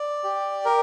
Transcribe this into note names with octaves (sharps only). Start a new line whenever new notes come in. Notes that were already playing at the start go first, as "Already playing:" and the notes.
Already playing: D5
G4
A#4